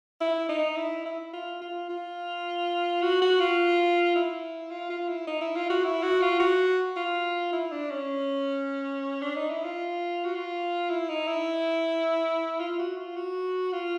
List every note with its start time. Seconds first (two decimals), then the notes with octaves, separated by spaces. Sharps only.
0.21 E4
0.49 D#4
0.77 E4
1.06 E4
1.33 F4
1.62 F4
1.90 F4
3.02 F#4
3.22 F#4
3.40 F4
4.16 E4
4.71 F4
4.90 F4
5.09 E4
5.27 D#4
5.41 E4
5.56 F4
5.70 F#4
5.84 E4
6.03 F#4
6.22 F4
6.40 F#4
6.96 F4
7.53 E4
7.72 D4
7.91 C#4
9.22 D4
9.36 D#4
9.50 E4
9.65 F4
10.24 F#4
10.35 F4
10.90 E4
11.10 D#4
11.28 E4
12.60 F4
12.79 F#4
12.97 F4
13.16 F#4
13.73 F4